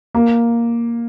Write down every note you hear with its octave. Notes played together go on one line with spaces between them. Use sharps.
A#3